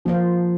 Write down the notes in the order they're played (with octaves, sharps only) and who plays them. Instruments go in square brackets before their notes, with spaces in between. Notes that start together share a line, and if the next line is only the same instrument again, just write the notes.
[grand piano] F3 [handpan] A#3 F4 C5